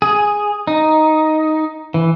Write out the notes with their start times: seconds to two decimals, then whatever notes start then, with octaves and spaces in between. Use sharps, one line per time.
0.02 G#4
0.67 D#4
1.94 E3